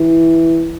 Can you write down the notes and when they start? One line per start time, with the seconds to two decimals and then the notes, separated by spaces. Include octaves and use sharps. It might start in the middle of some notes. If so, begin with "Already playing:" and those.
Already playing: E3